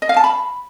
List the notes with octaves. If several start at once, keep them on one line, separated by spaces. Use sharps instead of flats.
D#5
F5
A5
B5